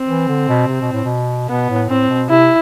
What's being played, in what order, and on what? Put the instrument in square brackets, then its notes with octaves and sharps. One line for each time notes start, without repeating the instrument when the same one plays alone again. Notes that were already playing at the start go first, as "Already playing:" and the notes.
Already playing: [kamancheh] C4
[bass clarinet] E3
D3
B2
C3
B2
A2
B2
[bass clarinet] B2 [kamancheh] B3
[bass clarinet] A2
[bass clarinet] A2 [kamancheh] C4
[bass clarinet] B2
[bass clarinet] C3 [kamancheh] E4